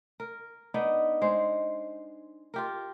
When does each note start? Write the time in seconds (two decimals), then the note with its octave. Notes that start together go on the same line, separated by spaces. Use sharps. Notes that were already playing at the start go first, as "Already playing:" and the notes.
0.20 A#4
0.74 B3 D4 D#4
1.22 G#3 C5
2.54 F4 G4 A#4